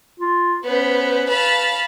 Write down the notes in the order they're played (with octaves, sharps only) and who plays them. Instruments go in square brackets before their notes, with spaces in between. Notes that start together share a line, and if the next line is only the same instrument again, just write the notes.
[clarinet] F4
[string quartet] B3 C#4 C5 [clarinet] B4
[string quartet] F5 A5 B5